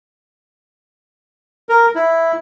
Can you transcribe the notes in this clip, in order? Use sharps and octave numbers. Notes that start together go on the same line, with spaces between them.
A#4
E4